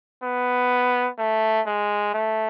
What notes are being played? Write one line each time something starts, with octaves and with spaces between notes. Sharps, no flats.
B3
A3
G#3
A3